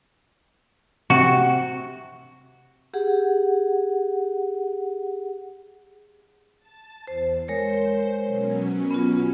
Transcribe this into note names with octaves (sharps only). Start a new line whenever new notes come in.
C3 F#4
G4 G#4 F#5
A5
E2 C5
G#3 A#4 C5 C#5
B2 F#3 C#4
B3 F4